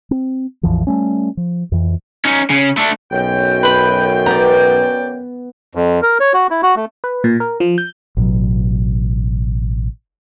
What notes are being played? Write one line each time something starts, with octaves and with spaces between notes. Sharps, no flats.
C4
A1 E2 E3 F3
G3 A3 C#4
F3
F2 E3
C#4 D#4
C#3 C#4
A3 D4
B1 F#2 G5
B4 B5
B3 D5 A#5
F2
A#4
C#5
F#4
E4
F#4
A3
B4
A#2
A#4
F3
G6
A1 B2 F#3